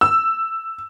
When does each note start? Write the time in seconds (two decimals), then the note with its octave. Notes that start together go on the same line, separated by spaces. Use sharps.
0.01 E6